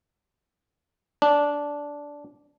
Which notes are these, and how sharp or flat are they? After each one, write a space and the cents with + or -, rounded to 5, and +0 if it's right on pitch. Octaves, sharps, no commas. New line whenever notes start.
D4 -10